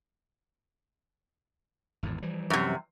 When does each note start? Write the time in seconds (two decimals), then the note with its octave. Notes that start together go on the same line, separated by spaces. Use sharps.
2.03 G#1 E2 A2
2.22 E3 F3 G3
2.50 F#2 C3